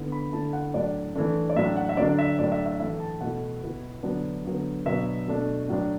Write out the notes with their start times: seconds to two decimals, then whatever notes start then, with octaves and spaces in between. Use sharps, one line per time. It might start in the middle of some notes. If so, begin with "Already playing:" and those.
Already playing: D3 B3 E4
0.12 B5
0.32 D3 A3 E4 A5
0.53 F#5
0.74 A2 F#3 D4 D5
1.16 E3 A3 D4
1.50 D5
1.56 A2 F#3 D4 E5
1.77 F#5
1.89 E5
1.97 D3 F#3 D4 D5
2.18 E5
2.39 A2 F#3 D4 D5
2.52 E5
2.66 E5
2.80 E3 A3 E4 E5
3.00 A5
3.21 B2 A3 E4 F#5
3.62 B2 B3 E4
4.03 D3 F#3 B3 D4
4.45 D3 F#3 B3
4.86 B2 F#3 B3 D4 E5
5.27 B2 A3 D4
5.68 A2 F#3 D4